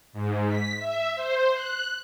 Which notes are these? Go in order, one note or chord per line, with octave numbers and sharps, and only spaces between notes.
G#2
B6
E5
C5
F#6